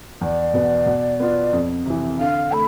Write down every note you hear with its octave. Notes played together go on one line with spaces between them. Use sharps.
E2 D5
B2 B3
B2
B3 F4
F2
C3 E3
D3 F5
A3 B5